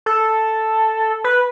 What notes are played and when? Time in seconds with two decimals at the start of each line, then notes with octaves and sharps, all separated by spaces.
0.06 A4
1.24 B4